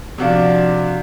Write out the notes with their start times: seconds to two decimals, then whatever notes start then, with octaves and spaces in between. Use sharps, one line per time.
0.18 C3 F3 D4 F#4 F5